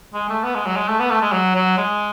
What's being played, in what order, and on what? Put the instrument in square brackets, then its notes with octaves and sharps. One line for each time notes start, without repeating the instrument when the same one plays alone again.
[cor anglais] G#3
A3
B3
G#3
F#3
G#3
A3
B3
A3
G#3
F#3
F#3
G#3